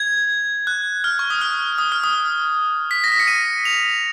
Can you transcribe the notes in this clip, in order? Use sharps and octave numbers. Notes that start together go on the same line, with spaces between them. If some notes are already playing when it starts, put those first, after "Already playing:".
Already playing: G#6
F#6
F6
C#6
D#6
F6
D#6
F6
D#6
B6
A#6
B6
C#7
D#7
F7